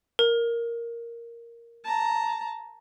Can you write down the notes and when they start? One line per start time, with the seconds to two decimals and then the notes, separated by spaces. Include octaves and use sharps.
0.19 A#4
1.84 A5 A#5